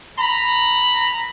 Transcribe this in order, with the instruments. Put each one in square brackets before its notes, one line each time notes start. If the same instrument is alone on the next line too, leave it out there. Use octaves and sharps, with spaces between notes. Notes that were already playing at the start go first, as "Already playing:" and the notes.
[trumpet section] A#5 B5